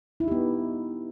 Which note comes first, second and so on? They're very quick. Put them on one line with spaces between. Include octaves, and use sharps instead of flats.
E4 D#4 G4 B3